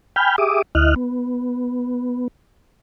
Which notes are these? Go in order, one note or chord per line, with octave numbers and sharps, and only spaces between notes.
G5 G#5 B5 F6 G6
G4 G#4 E5 D6 D#6
D2 E4 D#5 F6 F#6
B3